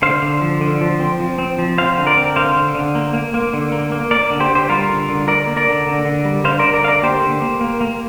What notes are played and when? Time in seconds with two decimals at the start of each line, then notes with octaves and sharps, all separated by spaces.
0.02 D3 C5 F5
0.22 D3
0.41 F3
0.61 D3
0.81 F3
1.00 C4
1.20 F3
1.38 C4
1.59 F3
1.78 C4 C5 F5
1.97 D3
2.07 A#4 D5
2.17 C4
2.36 D3 C5 F5
2.56 D3
2.75 D3
2.95 A#3
3.13 A#3
3.34 A#3
3.53 D3
3.72 A#3
3.92 A#3
4.11 A#3 A#4 D5
4.30 D3
4.40 G4 C5
4.50 D3
4.55 G4 C5
4.69 G3 F4 A#4
4.89 D3
5.09 D3
5.27 D3 A#4 D5
5.47 A#3
5.57 A#4 D5
5.67 D3
5.87 D3
6.05 D3
6.25 G3
6.44 D3 C5 F5
6.59 D3 A#4 D5
6.74 A#4 D5
6.83 D3 F5
6.88 A#4 D5
7.02 A#3 G4 C5
7.22 D3
7.42 A#3
7.61 A#3
7.81 A#3